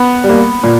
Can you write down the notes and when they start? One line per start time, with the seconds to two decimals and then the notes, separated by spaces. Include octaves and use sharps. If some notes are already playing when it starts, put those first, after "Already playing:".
Already playing: B3
0.24 G3
0.29 A#3
0.63 A#2